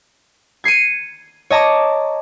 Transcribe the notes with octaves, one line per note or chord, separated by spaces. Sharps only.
G#6 C7 C#7 D#7
C#5 D#5 A5 A#5 D6